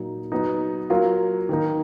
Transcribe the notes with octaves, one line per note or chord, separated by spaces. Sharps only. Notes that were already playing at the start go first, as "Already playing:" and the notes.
Already playing: A#2 F#3 A#3 D#4
F#3 B3 D#4
F#3 A#3 F4
D#3 A#3 D#4